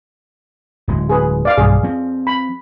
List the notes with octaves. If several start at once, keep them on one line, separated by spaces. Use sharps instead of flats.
D1 G#3
G#4 B4
D5 F5
B1 G2 G#4
F3 C4
B5